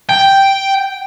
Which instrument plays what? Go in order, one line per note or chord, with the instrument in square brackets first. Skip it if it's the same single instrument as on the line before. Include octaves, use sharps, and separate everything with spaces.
[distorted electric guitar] G5